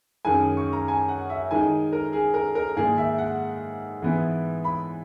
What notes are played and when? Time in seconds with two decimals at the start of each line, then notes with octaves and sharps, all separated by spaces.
0.25 F#2 D#3 G#3 G#5
0.57 C#6
0.73 A#5
0.88 G#5
1.09 F#5
1.30 E5
1.51 D#3 G#3 D#4 G#5
1.93 A#4
2.13 G#4
2.34 A#4
2.55 A#4
2.76 G#2 D#3 A#3 D#4 G#4
2.98 E5
3.18 F#5
4.02 G#2 E3 B3 E4
4.64 B5